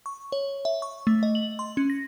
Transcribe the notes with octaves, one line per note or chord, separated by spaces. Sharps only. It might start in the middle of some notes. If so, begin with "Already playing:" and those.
C#6
C#5
E5
C#6
A3
D#5
F#7
C6
C#4
A#6